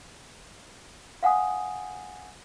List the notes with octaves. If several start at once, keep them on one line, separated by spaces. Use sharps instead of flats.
F5 F#5 G#5 D#6